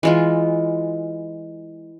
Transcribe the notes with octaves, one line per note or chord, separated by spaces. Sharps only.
E3 G#3 F4